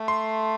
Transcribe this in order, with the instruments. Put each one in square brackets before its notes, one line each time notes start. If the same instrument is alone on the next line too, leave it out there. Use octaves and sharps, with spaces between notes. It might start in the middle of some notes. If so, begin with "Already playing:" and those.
Already playing: [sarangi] A3
[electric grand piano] C6